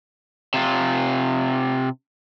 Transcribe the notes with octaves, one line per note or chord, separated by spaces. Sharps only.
C3 F4